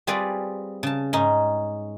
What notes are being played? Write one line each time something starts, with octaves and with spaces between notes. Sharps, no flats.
G3 C4 F4 G#4 B4 D5
C#3 A5
G#2 C#4 D#4